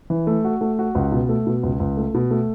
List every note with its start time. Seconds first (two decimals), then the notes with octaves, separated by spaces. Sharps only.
0.10 E3
0.27 A3
0.45 F#4
0.61 A3
0.79 F#4
0.95 C#2
1.12 B2
1.29 A3
1.47 B2
1.63 C#2
1.80 C#2
1.97 A3
2.14 B2
2.31 A3